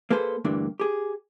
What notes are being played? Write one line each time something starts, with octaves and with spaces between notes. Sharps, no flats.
A#3 G#4 A4 B4 C5
D2 G2 E3 A#3 D4
G4 G#4